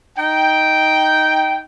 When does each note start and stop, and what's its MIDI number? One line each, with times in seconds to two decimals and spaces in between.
0.17 1.62 63
0.17 1.62 79